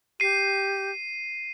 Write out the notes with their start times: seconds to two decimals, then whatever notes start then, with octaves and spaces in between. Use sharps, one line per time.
0.20 G4 C7 D#7